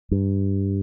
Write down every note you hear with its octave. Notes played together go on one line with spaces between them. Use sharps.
G2